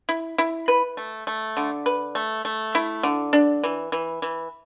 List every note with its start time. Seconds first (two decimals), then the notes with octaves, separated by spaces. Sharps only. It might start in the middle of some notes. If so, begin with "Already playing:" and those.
0.09 E4
0.38 E4
0.68 B4
0.97 A3
1.27 A3
1.57 D3
1.86 B4
2.15 A3
2.45 A3
2.75 E4
3.03 D3
3.33 D4
3.64 E3
3.92 E3
4.22 E3